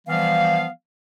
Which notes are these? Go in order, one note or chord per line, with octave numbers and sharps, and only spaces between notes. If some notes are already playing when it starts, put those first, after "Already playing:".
E3 F3 G3 B3 F5